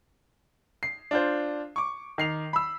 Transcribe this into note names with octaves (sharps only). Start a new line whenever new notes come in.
C7
D4 F4 C5
C#6 D6
D#3 C7 F7
B5 E6